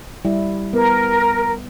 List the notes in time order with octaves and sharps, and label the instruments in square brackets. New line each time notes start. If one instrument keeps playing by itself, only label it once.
[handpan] G3 E4
[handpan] B3 [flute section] A#4